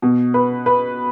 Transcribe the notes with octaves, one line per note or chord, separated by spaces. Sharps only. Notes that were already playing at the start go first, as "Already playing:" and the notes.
B2
B4
B4